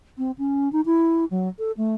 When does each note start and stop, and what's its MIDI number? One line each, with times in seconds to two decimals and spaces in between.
0.18 0.31 60
0.38 0.71 61
0.72 0.81 63
0.86 1.25 64
1.31 1.48 54
1.59 1.72 69
1.77 1.95 57